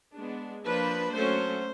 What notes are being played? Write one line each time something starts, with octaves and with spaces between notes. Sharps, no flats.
G#3 B3 D4
F3 A#3 D4 B4
F#3 A3 C#4 C5